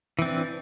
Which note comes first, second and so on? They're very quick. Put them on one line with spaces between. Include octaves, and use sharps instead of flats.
E3 C4 D4